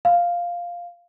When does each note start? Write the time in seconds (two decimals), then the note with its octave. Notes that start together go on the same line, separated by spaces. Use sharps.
0.05 F5